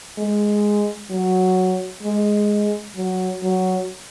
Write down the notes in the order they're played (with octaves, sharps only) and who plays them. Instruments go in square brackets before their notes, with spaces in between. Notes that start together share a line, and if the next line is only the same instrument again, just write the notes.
[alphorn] G#3
F#3
G#3
F#3
F#3